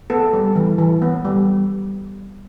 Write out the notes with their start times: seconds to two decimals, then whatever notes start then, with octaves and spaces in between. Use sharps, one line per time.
0.10 B3 A4
0.33 G3
0.56 E3
0.78 E3
1.02 B3
1.25 G3